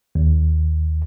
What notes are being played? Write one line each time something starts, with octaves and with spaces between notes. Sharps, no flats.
D#2